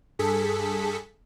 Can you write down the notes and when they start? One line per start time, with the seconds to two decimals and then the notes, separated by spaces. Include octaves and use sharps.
0.19 G2 G#4 A4 B6 C#7